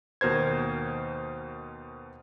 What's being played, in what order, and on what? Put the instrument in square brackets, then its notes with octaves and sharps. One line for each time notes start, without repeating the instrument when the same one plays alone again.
[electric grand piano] D#2 B2 A#4 C5 G#6